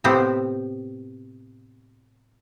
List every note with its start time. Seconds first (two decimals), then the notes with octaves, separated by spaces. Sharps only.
0.04 A2 C3 B3 C4 G4 C5